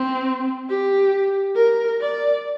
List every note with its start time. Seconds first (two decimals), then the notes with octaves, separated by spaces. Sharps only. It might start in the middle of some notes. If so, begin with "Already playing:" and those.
Already playing: C4
0.70 G4
1.56 A#4
2.01 D5